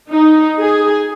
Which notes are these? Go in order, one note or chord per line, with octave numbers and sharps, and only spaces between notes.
D#4
G#4